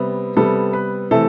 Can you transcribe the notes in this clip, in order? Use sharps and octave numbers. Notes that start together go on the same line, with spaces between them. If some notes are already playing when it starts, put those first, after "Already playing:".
Already playing: C3 G3 B3
C3 G3 B3 A4
B4
C3 E3 A3 A4